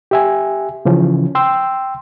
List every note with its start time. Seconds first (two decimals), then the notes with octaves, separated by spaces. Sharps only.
0.11 G4 E5 G#5
0.85 C#3 E3 F3 C#4
1.35 G5 C6 E6